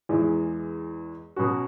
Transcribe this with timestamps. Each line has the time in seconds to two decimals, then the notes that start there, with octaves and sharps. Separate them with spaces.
0.09 E2 E3 G#3
1.36 B2 F#3 C#4 F#4